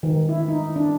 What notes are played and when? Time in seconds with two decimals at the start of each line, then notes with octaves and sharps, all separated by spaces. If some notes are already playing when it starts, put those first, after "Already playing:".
0.03 D#3
0.29 E4
0.48 D#4
0.76 D4